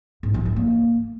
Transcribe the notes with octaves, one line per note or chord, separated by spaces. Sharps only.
G#2
E3
A3
A#3